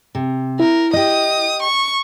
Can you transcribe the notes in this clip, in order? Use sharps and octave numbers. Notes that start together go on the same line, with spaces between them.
C3
E4 A#4
G4 D#5 D#6
C#6